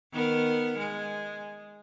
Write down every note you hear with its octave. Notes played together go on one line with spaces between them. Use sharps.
D#3 B3 A#4
G#3